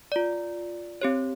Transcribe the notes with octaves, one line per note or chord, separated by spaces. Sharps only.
F4 D5
C4 G4 C#5